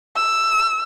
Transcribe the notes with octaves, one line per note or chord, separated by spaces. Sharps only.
E6